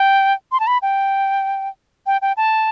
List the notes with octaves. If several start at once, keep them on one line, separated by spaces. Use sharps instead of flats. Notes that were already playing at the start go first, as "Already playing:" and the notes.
Already playing: G5
C6
A5
B5
G5
G5
G5
A5